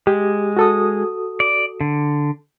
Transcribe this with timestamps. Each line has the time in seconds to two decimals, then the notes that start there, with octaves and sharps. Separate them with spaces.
0.07 G#3 G4
0.56 F#4 A4 D#6
1.40 D5
1.81 D3